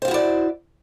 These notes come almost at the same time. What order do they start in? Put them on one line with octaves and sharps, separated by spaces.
C5 F5 F#4 E4 D5